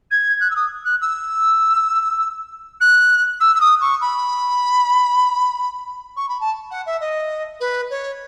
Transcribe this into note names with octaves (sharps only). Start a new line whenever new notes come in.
G#6
F#6
E6
D#6
F#6
E6
F#6
E6
E6
D#6
C#6
B5
C#6
B5
A5
F#5
E5
D#5
B4
C#5